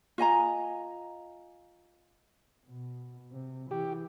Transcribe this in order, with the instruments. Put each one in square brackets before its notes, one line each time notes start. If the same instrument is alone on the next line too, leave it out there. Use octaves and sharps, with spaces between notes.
[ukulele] F4 D#5 G#5 A#5
[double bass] B2
C3
[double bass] E3 [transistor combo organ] G4